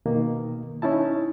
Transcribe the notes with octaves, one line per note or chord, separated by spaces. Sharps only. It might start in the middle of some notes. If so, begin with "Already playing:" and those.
B2 D#3 A#3
C#4 D#4 E4 A5